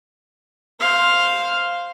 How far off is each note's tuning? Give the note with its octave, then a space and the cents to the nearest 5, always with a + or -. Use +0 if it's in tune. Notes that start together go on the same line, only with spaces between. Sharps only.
C5 +0 F5 +0